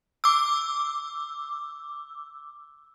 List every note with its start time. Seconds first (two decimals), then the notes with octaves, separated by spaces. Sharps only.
0.24 D6 E6